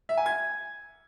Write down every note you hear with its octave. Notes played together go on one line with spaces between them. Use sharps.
E5
G#5
G#6